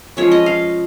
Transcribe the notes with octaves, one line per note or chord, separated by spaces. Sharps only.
F3 G#3 C#4 C#5
D#5
F5